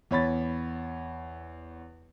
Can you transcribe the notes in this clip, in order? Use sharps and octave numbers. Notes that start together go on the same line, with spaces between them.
E2 C#5 B5 A6